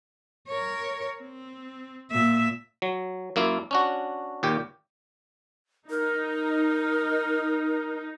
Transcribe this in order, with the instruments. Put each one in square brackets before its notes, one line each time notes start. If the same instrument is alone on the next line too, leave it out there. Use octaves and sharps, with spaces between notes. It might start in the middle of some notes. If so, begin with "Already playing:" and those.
[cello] A#4 C#5
C4
A#2 E5
[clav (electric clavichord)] F#3
F#2 A#3 E4 F4
C#4 D4 F#4
D#2 A#2 G4
[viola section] D#4 [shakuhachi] A#4